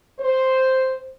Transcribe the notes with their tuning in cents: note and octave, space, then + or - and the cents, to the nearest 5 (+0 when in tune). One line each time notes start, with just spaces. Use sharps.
C5 +0